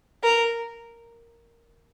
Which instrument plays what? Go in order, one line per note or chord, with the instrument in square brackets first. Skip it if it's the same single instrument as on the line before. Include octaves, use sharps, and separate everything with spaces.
[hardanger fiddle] A#4